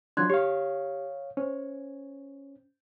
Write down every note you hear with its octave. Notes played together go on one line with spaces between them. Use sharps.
F3 F#3 D4 C6 F#6 G#6
G4 C#5 F5
C#4 C5